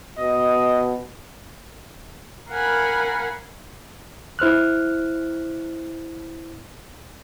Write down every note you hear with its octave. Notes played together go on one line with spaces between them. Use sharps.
B2 D#5
A#4 F5 F#5 G#5 B5
E4 C5 F6 F#6